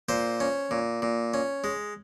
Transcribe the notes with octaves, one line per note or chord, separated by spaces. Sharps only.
A#2 C5
C#4
A#2
A#2
C#4
G#3